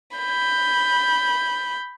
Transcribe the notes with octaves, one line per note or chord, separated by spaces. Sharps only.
B5 G6